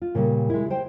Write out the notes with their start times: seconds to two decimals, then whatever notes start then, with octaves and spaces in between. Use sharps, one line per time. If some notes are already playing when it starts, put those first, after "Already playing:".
0.02 F4
0.15 A#2 C#3 G3
0.50 G#3 E4
0.70 C5 G5